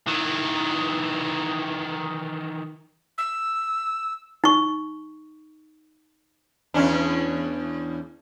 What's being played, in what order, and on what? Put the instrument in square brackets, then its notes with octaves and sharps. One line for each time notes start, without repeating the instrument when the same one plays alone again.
[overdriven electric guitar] D#3 E3
[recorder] E6
[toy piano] D#4 C#6
[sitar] E2 C#4 D4